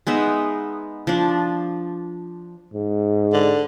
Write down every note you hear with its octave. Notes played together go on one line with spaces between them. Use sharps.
G#3 B3 D#4 E5
F3 D4
G#2
D3